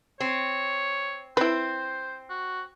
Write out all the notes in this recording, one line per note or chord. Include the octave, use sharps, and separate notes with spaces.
C4 C#5
C4 E4 B4 C5
F#4